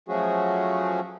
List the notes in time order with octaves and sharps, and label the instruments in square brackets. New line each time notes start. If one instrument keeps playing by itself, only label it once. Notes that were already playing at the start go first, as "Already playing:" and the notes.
[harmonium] F3 F#3 A3 C#4 F#4 G#4